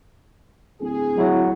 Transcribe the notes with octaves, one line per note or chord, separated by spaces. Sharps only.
D1 G#4
F#3 G#3 E4 C#5